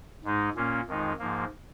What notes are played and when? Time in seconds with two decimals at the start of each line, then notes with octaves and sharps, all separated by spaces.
0.24 G#2 G#3 D#4
0.56 A#2 A#3 C#4
0.87 F2 D#3 G#3 D#4
1.19 G#2 F3 A#3